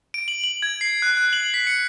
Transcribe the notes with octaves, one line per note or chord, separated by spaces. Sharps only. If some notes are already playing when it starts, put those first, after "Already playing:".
D7
F#7
F#7
G#6
C7
F#6
F#6
F#7
B6
C#7